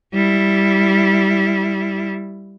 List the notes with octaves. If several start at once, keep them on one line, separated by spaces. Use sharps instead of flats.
G3 E4